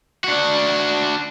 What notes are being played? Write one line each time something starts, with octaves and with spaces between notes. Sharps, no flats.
D4 F#4